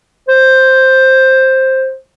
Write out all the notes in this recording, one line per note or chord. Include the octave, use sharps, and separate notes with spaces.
C5